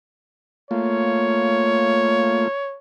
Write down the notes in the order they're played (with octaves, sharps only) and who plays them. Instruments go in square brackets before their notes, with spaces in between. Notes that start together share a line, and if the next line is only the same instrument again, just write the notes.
[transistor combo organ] A3 A#3 F4 [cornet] C#5